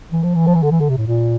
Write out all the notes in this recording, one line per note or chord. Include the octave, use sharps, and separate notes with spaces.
E3
F3
E3
F3
E3
D3
E3
D3
C3
A2
A#2